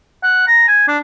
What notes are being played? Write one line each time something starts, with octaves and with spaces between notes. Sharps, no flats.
F#5
A#5
G#5
D4